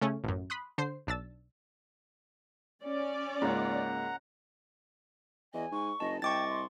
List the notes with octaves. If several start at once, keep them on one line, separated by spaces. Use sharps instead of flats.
C#3 A3 C#4
A1 F#2
B5 C6 D#6 F#6
D3 C5 C7
B1 D4 E6 A6
C#4 D5
C#2 G#2 A#3 F#5 A#5
E2 D#5 G#5
G#2 C#6
F#1 D#5 A5
C2 D#5 G5 C#6 D6 A6
C6